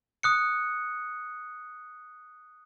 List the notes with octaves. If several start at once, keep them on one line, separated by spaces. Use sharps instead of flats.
D#6 F#6 C#7